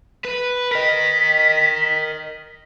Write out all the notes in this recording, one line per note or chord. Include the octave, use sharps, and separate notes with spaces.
B4
A#4 D#5 B6